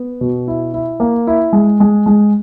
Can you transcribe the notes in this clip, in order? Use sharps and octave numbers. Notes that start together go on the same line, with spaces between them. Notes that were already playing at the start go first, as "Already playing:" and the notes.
Already playing: B3
B2
E4
E4
A#3
E4
G#3
G#3
G#3